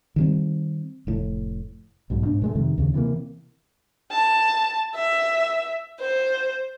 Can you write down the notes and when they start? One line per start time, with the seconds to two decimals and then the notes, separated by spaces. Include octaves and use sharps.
0.16 D#3 G3 C4
1.07 F1 A2
2.10 B1 G#2 B2
2.26 G#2 D4
2.42 A#2 G#3 A3
2.55 F2 C3 D#3
2.78 D#2 C#3
2.94 C3 E3 G#3 A#3
4.12 A5
4.95 E5
6.00 C5